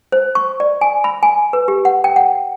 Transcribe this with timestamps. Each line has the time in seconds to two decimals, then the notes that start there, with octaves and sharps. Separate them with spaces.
0.12 C5
0.35 C#6
0.60 D5
0.81 G#5
1.04 B5
1.23 G#5
1.53 B4
1.68 G4
1.85 F#5
2.04 G5
2.16 F#5